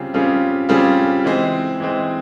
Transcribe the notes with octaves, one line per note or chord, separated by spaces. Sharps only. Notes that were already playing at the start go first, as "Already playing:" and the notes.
Already playing: C#3 G3 C4 F4 G#4
C#3 G3 C4 F4 G#4
C#3 G3 C4 F4 G#4
E3 G#3 C4
E3 G#3 C4